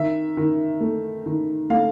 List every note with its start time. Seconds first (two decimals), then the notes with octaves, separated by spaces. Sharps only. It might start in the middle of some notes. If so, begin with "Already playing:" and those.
Already playing: D#3 E5
0.37 D#3
0.81 A3
1.26 D#3
1.70 A3 F5